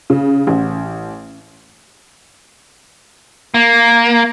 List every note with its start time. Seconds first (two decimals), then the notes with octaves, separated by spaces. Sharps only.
0.10 C#3
0.47 A1
3.54 A#3